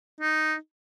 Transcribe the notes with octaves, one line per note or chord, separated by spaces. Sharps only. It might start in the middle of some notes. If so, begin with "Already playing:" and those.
D#4